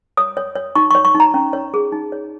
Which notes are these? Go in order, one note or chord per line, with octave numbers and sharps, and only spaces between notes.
C#5 D#6
C#5
C#5
D#4 C#6
C#5 C#6
C#6
D#4
A#5
C#4
C#5
G#4
D#4
C#5